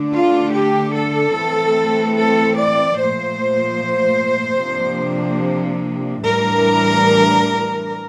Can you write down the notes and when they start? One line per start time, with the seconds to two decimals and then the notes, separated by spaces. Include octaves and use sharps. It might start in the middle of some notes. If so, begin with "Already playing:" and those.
Already playing: D3 A3 D4
0.13 F4
0.53 G4
0.94 A4
1.35 E3 A3 C4
2.16 A4
2.57 D5
2.97 A#2 F3 A3 C5
4.60 C3 F3 A#3 D4
6.23 A2 E3 G3 D4 A#4